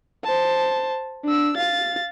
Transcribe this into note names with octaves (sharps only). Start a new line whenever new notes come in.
C5 A5
D4 E6
F5 A6